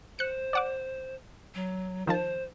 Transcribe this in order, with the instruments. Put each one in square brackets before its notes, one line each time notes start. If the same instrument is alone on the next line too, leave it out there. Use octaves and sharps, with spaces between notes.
[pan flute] C5 [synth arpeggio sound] F#6 C#7
[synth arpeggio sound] D5 F#5 D6
[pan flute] F#3
[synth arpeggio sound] D#3 F3 A5 [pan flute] C5